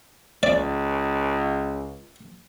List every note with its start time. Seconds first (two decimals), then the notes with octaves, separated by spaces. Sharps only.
0.43 C#2 D5